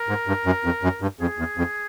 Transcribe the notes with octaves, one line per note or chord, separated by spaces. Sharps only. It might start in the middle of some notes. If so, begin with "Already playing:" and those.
Already playing: A#4
G#2
G2
F#2
F2
F#2
G2
F2 G#4
E2
F2